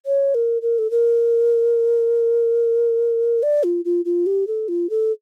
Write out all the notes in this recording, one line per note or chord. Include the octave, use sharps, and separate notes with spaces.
C#5
A#4
A#4
A4
A#4
D5
F4
F4
F4
G4
A4
F4
A4